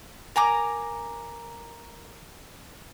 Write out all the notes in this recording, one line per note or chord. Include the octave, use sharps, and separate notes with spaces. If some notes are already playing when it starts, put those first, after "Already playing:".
A#4 G#5 A#5 D6